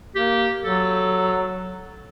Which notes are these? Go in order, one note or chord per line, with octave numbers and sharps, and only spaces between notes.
A#3 G4
F#3 A4